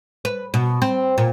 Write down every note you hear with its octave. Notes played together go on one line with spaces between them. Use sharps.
B4
B2
C4
A#2